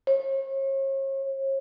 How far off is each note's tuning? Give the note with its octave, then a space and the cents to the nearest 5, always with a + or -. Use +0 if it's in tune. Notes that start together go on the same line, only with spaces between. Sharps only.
C#5 -40